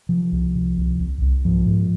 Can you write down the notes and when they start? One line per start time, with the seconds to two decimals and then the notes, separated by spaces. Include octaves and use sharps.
0.09 C3 F3
0.32 C2
0.55 C3
0.78 C2
0.99 C2
1.22 C2
1.45 G#2 F3
1.66 G#2